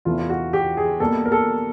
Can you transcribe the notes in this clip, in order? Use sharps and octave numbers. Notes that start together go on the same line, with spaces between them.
E2 C3 E3 A3 F4
F4
F#4
G4
G#4
B2 G3 A#3 A4
A#4
A4